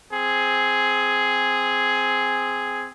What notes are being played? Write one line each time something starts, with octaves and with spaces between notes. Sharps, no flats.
C4 G#4